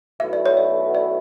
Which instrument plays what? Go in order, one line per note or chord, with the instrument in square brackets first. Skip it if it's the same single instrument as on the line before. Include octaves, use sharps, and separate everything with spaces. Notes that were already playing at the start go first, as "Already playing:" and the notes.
[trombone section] B1 B2 A3 E4 [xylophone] E5
[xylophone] D5
C#5
D5
D5